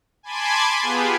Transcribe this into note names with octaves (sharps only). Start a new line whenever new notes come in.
G#5 A5 B5 C6 D6 G#6
B3 F4 G4 G#4 B4